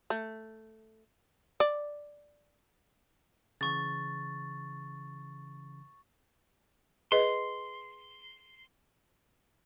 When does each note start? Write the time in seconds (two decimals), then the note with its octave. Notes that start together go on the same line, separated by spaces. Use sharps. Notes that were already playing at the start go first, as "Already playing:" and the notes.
0.10 A3
1.60 D5
3.61 C#3 E3 C#6 A6
7.12 G#4 B4 D#5 C6